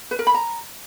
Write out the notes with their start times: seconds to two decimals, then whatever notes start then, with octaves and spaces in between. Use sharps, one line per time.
0.11 B4
0.19 A#4
0.27 B5
0.35 A#5